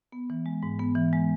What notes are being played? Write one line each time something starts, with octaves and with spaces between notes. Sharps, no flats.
B3
E3
G#3
G#2
B3
E3
G#3